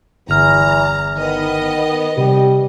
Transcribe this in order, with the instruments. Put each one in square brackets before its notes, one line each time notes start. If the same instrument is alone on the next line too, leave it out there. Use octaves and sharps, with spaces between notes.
[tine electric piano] G1 F6 [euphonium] E2 [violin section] A#5
[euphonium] D#3 [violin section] B3 D#5
[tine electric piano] C3 [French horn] G3